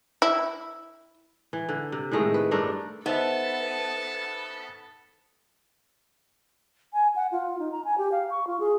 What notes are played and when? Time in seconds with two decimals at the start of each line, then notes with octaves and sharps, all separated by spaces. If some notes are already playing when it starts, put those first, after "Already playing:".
0.22 E4
1.53 E3
1.69 D3
1.92 C3
2.12 A2 D#3 G#3 A3
2.34 B4
2.51 G2 A3 D4 A#4
3.06 B3 D#4 A4 C5 E5 A5
6.93 G#5
7.16 F#5
7.32 F4
7.59 D#4
7.72 A#5
7.85 G#5
7.98 G4
8.12 F5
8.30 C#6
8.47 F4
8.60 G#4